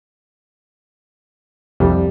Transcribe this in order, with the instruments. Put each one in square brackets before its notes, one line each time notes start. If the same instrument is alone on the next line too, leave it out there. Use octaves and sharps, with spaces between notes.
[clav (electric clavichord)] C2 F2 [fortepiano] G3